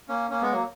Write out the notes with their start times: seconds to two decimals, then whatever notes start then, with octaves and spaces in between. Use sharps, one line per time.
0.09 A#3 C#4
0.30 A#3 C#4
0.41 G#3 B3
0.52 F#3 A#3